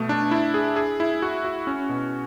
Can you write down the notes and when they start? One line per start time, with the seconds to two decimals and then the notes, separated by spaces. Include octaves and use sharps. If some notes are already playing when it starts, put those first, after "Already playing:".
Already playing: B2 A3
0.09 D4
0.31 E4
0.54 G#4
0.76 G#4
1.00 E4
1.22 F#4
1.45 F#4
1.67 C#4
1.89 B2